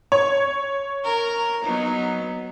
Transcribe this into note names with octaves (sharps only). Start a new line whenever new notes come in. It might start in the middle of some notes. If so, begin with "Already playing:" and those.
C#5
A#4
F#3 B3 D#4